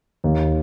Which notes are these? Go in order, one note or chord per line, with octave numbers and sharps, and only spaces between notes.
D#2